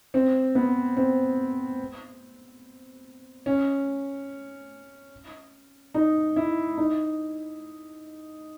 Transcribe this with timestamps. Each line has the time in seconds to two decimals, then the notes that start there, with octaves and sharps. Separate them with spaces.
0.14 C4
0.55 B3
0.97 C4
3.46 C#4
5.95 D#4
6.36 E4
6.78 D#4